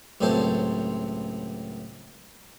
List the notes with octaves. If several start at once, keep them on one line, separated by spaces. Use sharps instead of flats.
C#2 F#2 A2 C4 C5 A5